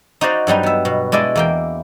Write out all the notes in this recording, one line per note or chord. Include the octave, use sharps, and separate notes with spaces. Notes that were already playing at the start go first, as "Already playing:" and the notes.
D#4 F#4 C5 D5 D#5 F5
G2 F#3 G3 D#4
B3 E5
B2
G#3 D4 E4 D5 D#5
E2 A#3 G5